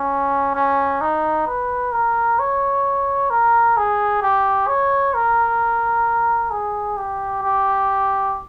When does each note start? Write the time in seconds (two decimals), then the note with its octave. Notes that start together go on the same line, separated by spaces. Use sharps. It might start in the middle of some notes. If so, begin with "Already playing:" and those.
Already playing: C#4
0.55 C#4
1.01 D#4
1.47 B4
1.93 A#4
2.40 C#5
3.30 A#4
3.77 G#4
4.22 G4
4.68 C#5
5.14 A#4
6.51 G#4
6.97 G4
7.43 G4